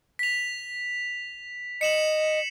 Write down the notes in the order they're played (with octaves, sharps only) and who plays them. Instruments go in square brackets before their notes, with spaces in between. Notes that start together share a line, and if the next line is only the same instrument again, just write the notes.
[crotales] B6 F7
[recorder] D#5 [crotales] C#7 E7 F#7